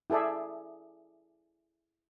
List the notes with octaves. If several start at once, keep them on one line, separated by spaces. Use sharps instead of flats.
E4 G#4 A4 D5 E5